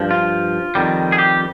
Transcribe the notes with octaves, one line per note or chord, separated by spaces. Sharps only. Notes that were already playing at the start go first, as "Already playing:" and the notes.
Already playing: G2 F3
F4
F2 D#3 G3
G#4
G4